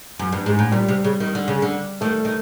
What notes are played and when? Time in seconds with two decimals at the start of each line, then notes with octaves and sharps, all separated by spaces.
0.19 F#2
0.32 G2
0.46 G#2
0.59 A2
0.72 A#2 G3
0.89 C3
1.04 C#3
1.20 D#3
1.35 D3
1.48 C#3
1.62 D3
2.01 D#3 A3
2.25 D#3